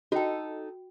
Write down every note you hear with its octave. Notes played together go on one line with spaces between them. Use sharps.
D#4 F#4 A4 G5